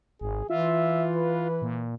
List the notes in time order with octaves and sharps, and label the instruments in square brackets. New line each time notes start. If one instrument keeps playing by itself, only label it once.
[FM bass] G#1 [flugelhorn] G#4
[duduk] E3 [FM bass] F4 [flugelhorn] E5
[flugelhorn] B4
[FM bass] A#2